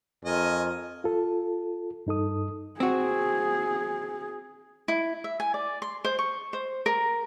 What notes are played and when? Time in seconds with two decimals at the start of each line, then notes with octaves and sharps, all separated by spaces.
0.25 F2 A3 F4 A#4 D#5 G#5
1.04 F4 A4
2.07 G2 D#4 A4 D#6
2.80 C4 F#4 G#4
4.88 E4
5.24 E5
5.40 G#5
5.54 D5
5.82 C6
6.05 C5
6.19 C#6
6.53 C5
6.86 A#4